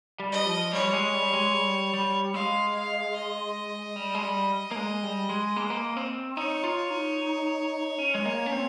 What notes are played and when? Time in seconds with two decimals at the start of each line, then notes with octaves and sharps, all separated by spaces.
0.20 G3
0.32 D#5
0.46 F3
0.73 G3 C#5
0.93 G#3
1.14 G3
1.33 G#3
1.53 G3
1.94 G3
2.34 G#3 F5
2.75 F5
3.15 D#5
3.96 G3
4.15 G#3
4.22 G3
4.71 A#3
4.76 G#3
5.03 G3
5.29 G#3
5.56 A#3
5.63 G#3
5.70 A#3
5.97 C4
6.37 D#4 C#5
6.64 F4
6.91 D#4
7.98 C#4
8.15 G#3
8.25 A#3
8.46 C#4
8.52 C4